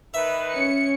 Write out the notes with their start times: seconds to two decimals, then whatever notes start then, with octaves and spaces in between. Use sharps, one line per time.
0.14 D#3 B4 E5
0.54 C#4 C#7